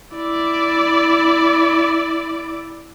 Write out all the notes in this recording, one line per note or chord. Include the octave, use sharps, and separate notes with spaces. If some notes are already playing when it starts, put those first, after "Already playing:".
E4 D5